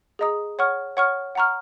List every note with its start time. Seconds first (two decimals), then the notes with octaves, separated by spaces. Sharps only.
0.19 G#4 D#5 A#5 D#6
0.59 C#5 F#5 C#6 F6
0.97 C#5 F#5 C#6 F6
1.35 F#5 A#5 C#6 F6